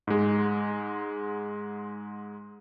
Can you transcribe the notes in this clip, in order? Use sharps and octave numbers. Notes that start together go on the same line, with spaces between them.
G#2 G#3